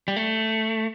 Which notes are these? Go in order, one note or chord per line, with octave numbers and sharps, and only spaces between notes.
G3
A3